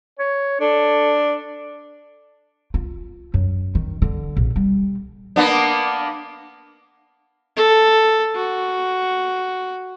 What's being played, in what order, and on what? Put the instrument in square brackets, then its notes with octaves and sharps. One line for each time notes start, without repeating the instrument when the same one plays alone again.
[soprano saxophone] C#5
[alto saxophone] D4 [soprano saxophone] A4
[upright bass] F4
F#2
D#3
D3
A#1
G3
[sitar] A#3 B3 D4
[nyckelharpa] A4
F#4